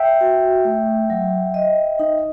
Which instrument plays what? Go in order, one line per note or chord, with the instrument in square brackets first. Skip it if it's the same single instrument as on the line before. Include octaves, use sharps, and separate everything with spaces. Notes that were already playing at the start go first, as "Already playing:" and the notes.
Already playing: [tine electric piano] E5 G5
[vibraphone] F#4
A3
F#3
D#5
D#4